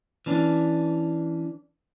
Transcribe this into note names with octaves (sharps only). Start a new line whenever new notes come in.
E3 C#4 D4